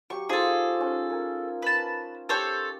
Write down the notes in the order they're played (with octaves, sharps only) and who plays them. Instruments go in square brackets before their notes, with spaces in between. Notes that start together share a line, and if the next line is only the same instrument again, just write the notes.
[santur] F#3 G4 [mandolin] C#6
[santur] D#4 F4 C5 [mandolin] G#4 A4
[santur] C#4 D#4
A#4 G#5
[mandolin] B4 A5
[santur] G4 [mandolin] A4 C5 C#5